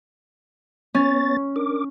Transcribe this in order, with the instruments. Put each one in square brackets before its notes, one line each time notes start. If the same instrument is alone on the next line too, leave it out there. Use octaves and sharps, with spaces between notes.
[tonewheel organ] B3 C#5 A6 [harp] C#4
[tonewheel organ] D4 A#4 D6